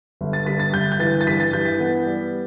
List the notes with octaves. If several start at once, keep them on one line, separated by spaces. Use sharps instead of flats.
G1
A6
G2 B6
A6
G1 G6
G6
E3 A6
A6
G2 B6
A6
E3 G6
B6
B3
G3